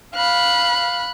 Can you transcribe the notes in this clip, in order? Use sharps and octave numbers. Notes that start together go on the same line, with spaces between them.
F5 B5 F#6